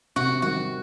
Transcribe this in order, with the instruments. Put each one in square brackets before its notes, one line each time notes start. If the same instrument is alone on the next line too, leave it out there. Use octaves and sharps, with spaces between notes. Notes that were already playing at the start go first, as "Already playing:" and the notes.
[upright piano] C3 [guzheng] F#4
[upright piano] D#3 G3 [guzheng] F#4